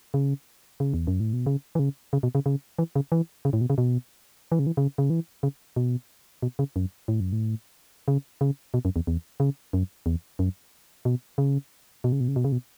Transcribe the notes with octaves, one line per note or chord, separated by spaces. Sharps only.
C#3
C#3
E2
F#2
A2
B2
C#3
E3
C#3
C#3
B2
C#3
C#3
E3
C#3
E3
C#3
A2
B2
C#3
B2
E3
C#3
E3
C#3
C#3
E3
C#3
B2
B2
C#3
F#2
A2
F#2
A2
C#3
C#3
B2
F#2
E2
E2
C#3
F#2
E2
F#2
B2
C#3
B2
C#3
B2
C#3
B2
C#3
B2